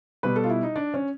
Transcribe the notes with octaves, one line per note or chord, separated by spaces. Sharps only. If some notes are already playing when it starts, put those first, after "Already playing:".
B2 G3 B4
A4
F4
E4
D#4
D4
C#4